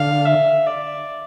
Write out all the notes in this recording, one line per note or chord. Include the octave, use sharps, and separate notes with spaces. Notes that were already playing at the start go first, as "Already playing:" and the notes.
Already playing: D3 F5
E5
D5